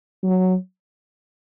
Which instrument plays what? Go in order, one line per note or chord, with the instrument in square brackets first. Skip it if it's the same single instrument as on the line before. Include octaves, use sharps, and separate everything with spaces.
[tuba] F#3